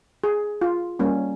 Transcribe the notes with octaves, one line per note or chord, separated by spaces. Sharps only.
G#4
F4
G3 A#3 C#4